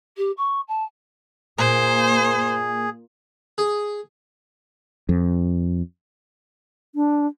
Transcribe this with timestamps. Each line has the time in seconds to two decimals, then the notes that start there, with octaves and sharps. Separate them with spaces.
0.17 G4
0.37 C#6
0.68 A5
1.58 A#2 A#3 G#4 C5
3.58 G#4
5.09 F2
6.95 D4